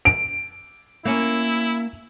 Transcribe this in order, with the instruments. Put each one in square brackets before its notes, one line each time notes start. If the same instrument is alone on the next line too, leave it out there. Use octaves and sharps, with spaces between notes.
[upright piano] D7
[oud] A#3 C#4 [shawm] E4